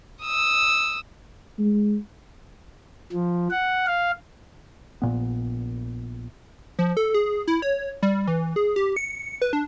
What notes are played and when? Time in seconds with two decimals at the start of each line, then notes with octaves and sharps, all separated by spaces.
0.23 D#6 E6
1.59 G#3
3.13 F3
3.50 F#5
3.87 F5
5.02 A#1 A#2 B3
6.79 F3
6.97 A4
7.14 G#4
7.47 E4
7.62 C#5
8.02 G3
8.27 E3
8.56 G#4
8.76 G4
8.96 C#7
9.42 B4
9.53 D4